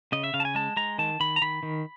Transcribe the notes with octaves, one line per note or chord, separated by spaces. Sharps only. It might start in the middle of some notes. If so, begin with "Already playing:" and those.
C#3 D#5
E5
C#3 F5
A5
G#5
G#3 A5
G#3 A#5
D#3 A5
D#3 B5
A#5
D#3 B5
D#3